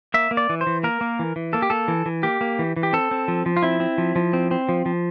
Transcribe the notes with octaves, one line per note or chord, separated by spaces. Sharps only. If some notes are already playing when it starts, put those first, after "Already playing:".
A#3 E5
A#3
D5
E3
C5
E3
A#3 A#4
A#3
E3
E3
A#3 A4
G4
A#3 A4
E3
E3
A#3 G4
A#3
E3
E3
G4
C4 A4
C4
F3
F3
F4
C4 E4
C4
F3
F3
C4
C4
F3
F3